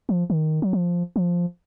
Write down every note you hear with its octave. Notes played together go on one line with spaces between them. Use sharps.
F3
D#3
F#3
F3
F3